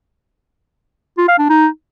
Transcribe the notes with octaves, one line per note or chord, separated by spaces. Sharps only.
F4
F5
D4
D#4